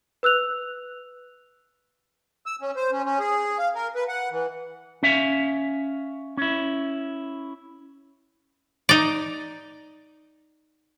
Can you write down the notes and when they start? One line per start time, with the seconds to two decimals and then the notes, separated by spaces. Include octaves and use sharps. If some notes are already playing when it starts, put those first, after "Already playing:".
0.23 B4 E6 F#6 F7
2.46 E6
2.61 C#4
2.76 C5
2.92 C#4
3.05 C#4
3.19 G#4
3.59 F5
3.75 A#4
3.95 B4
4.08 F#5
4.31 E3
5.03 C#4 E5 F5
6.37 C#4 E4
8.89 D#4 D5